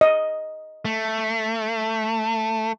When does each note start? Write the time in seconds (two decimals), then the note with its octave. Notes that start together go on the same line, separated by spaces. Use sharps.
0.01 D#5
0.85 A3